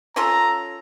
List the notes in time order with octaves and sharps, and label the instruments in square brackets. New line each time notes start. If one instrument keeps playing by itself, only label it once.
[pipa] C#4 F4 A4 [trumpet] A#5